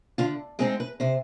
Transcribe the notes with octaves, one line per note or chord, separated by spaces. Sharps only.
D3 F4
G#3 C4 D#4 G#4
B4
C3 C5